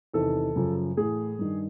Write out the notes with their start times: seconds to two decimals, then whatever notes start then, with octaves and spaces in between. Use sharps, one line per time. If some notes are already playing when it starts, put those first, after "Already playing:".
0.14 E2 C3 D#3 A4
0.56 F#2 C#3 F3
0.97 A2 E3 G#4
1.39 G2 D#3